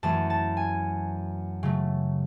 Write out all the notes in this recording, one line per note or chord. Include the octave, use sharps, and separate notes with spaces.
F#2 E3 A3 A5
A5
G#5
C#3 F#3 A3